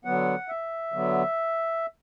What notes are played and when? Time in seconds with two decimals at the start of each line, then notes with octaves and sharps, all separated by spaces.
0.05 D3 F#3 B3 F#5
0.48 E5
0.92 D3 F#3 B3